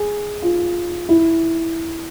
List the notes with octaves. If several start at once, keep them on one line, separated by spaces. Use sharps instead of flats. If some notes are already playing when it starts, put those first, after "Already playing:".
Already playing: G#4
F4
E4